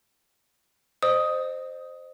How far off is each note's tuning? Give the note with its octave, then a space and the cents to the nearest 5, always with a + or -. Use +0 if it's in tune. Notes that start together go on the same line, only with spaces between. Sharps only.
C5 +0 D#5 -30 D#6 +10